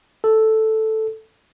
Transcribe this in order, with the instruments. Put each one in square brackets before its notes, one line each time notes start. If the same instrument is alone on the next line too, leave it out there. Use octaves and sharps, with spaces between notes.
[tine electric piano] A4